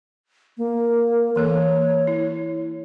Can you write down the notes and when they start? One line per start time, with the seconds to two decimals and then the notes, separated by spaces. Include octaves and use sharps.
0.58 A#3
1.36 E3 A#3 A4 C#5
2.07 E4